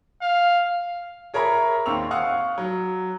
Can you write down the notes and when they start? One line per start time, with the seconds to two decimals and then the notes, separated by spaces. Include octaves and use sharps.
0.22 F5
1.34 G#4 A#4 C#5 E5 A#5 B5
1.86 D#2 C4 C#6 E6 F7
2.11 F5 F#5 C#6 D#6 F6
2.58 F#3